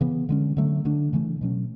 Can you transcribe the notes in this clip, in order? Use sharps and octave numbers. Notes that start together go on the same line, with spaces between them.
C#3 E3 B3
D3 G#3 C#4
D3 F#3 A3
D3 A3 D4
C#3 E3 A3
B2 F#3 A3 C#4